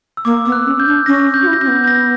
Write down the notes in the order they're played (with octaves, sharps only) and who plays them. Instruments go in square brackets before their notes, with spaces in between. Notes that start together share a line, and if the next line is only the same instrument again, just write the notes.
[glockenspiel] E6
[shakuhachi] A#3 [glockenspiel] D6
[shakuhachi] B3 [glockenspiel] E6
[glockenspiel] F#6
[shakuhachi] C#4
[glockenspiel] G6
[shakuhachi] D4
[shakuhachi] C#4 [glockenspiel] A#6
[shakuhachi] C#4
[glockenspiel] G6
[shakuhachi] F#4
E4
[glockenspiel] A#6
[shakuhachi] C#4 [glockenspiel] G6
[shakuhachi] B3
[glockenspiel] G6
A#6